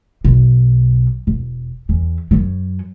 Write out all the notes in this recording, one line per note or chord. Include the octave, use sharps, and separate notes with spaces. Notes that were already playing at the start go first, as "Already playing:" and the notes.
B1
E1
E2
F#2 F#3